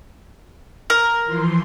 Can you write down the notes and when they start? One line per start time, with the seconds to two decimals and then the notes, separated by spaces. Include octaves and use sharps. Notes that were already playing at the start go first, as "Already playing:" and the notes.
0.90 A#4
1.25 E3 F3 C6